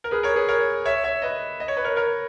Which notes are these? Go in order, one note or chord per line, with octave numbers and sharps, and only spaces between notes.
A#4
G#4 B4
A#4 C#5
G#4 B4
A#4 C#5
C#5 E5
C#5 E5
B4 D#5
D#5
C#5
B4
A#4 C#5
A#4 C#5